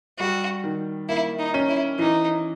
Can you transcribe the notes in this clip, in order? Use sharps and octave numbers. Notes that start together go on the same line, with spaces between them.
G3 F#4
D#3
A#3 E4
D#4
C#4
E4
E3 D#4